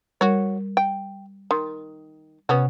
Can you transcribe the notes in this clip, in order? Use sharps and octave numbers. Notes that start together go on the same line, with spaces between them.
G3 F#4 A#4 C#5
G5
D#3 C6
C3 B3 C#4 F#4